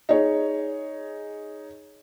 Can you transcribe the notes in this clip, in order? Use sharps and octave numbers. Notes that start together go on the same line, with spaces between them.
D#4 G#4 C#5